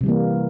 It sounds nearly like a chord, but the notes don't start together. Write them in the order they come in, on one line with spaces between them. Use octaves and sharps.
C3 G3 E3 A#3